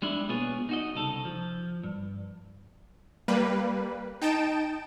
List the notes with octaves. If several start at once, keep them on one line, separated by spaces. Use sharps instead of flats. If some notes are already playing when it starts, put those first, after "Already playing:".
G3 G#3 D4 E4
B1 A#3 B3 F4 G#4 C#5
D#4 F#4 D#5
C2 C#3 D#4 A4
F3
G2
G3 A#3 B4
D#4 G5 A5 D7 E7